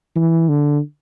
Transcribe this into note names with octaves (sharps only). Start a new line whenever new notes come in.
E3
D3